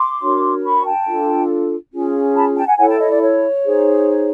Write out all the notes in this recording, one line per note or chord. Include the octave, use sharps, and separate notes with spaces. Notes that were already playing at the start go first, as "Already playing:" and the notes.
Already playing: C6 D6
D4 F#4 A#4 C#5
B5 C#6
G5 A5
D4 F4 A4
C#4 F4 G#4
A5 B5
G5 A5
F#5 G#5
E4 A4 C#5 F#5 G#5
G5 A5
C#5 D#5
D5
C#5
D#4 G#4 C5